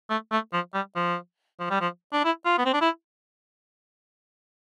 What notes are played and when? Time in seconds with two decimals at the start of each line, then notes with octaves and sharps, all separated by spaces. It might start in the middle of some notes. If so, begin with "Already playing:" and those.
0.10 A3
0.32 A3
0.53 F3
0.74 G3
0.96 F3
1.60 F3
1.71 G3
1.81 F3
2.13 D4
2.25 E4
2.46 F4
2.58 B3
2.66 C4
2.74 D4
2.81 E4